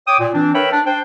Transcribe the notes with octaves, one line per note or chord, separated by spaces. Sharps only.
C#5 G5 D6 D#6
A#2
E3 C4 D4
A#4 B4 C#5 E5 G5 B5
D4
D4 C5 G5